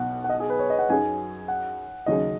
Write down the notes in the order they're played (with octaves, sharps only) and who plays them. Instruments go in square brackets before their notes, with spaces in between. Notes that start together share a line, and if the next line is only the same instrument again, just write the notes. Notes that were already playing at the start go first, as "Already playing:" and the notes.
Already playing: [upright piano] B1 B2 B3 [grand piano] F#5
[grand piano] F#5
D#5
G#4
B4
C#5
D#5
F#5
[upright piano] F#2 F#3 D#4 G#4 [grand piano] G#5
[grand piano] F#5
[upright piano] D#2 C#3 F#3 D#4 G#4 [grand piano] D#5